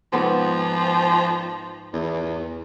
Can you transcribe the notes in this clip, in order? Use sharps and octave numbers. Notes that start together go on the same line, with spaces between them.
G#2 F3 B3 C5
E2